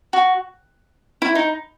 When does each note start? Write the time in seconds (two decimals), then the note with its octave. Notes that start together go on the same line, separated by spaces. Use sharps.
0.13 F#4
1.22 E4
1.35 D#4